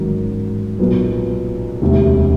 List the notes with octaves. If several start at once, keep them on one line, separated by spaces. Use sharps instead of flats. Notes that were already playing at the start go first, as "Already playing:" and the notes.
Already playing: A1 G#2 D#3 F#3
B1 A#2 F#3 B3
E1 D2 C3